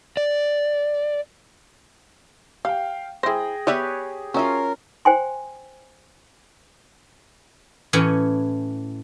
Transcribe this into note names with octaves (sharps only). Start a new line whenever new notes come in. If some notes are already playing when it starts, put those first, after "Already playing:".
D5
G4 F5 G5
E4 G#4 C5 G5 A#6
B3 G4 B4 C#5 D5 E5
C#4 F4 F#4 A#4 E5
C5 G5 G#5 C6
A2 E3 C#4